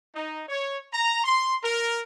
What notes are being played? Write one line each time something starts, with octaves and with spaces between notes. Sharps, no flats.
D#4
C#5
A#5
C6
A#4